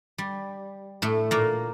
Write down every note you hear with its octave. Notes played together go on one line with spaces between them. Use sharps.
G3
A2 A3
A#2 A#3